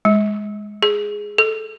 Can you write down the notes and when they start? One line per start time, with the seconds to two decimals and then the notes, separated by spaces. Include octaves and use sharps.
0.05 G#3
0.83 G#4
1.38 A4